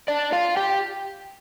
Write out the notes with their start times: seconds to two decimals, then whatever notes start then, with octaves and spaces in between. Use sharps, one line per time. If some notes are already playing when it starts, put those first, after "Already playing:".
0.08 D4 D5
0.32 F4 F5
0.57 G4 G5